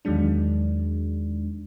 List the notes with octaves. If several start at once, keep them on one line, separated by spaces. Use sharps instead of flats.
E2 D#3 F#3 G#3 D4